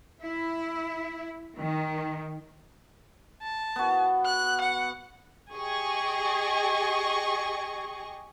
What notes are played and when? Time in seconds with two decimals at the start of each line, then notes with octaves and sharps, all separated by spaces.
0.23 E4
1.58 D#3
3.42 A5
3.76 B3 F#4
4.25 F#6
4.61 F#5
5.53 G4 G#4 D#5 C#6